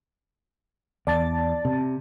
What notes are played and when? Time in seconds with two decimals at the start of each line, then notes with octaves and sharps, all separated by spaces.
1.07 E2 D5 A5 A6
1.65 C3